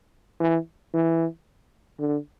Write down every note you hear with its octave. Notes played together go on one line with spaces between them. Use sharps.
E3
E3
D3